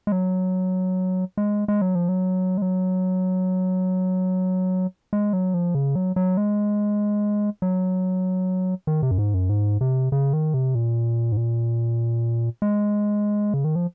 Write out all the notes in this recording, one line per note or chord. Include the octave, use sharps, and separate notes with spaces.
G#3
F#3
G#3
G#3
F#3
F3
F#3
G#3
F#3
G#3
F#3
F3
C#3
F#3
F#3
G#3
F#3
D#3
C3
F#2
G#2
F#2
G#2
C3
C#3
D#3
C3
A#2
G#2
A#2
G#3
C#3
D#3
F3